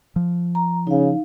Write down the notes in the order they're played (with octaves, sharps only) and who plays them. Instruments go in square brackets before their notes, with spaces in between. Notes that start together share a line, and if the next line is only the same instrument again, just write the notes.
[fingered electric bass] F3
[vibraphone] A#5
[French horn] C#3 [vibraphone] D#4 F5